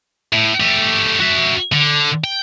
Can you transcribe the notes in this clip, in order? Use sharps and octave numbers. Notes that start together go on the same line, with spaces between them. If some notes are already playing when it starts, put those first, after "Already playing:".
A2
A3 G4
F#4 E5
D3
G5